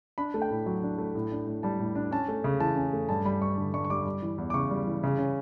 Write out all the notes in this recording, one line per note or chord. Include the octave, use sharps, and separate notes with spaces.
D4 B5
A3
G5
A2
F#3
D4
A3
A2
D4
A2
G3 A5
A2
D4
C#4 A5
A3
C#3
E3 A5
C#4
A3
G2 A5
G3 B5
G2 C#6
D3
G2 C#6
C#6
G3 D6
G3
E3
E2
D6
C#3 C#6
G3
E3
C#3
C#4